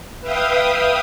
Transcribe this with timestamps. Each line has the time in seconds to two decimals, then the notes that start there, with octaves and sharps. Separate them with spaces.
0.21 B4 E5 F5 G5 D#6